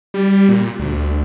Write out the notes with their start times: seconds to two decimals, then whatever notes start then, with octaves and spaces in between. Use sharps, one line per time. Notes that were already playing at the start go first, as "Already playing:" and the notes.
0.14 G3
0.49 A#2
0.79 D2